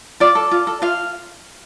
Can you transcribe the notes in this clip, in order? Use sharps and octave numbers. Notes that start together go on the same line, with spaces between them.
F4 D5
A4
F4
A4
F4 F5